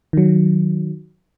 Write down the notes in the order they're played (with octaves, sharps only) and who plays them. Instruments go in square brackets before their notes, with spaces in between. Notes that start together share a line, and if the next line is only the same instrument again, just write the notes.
[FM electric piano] D#3 F#3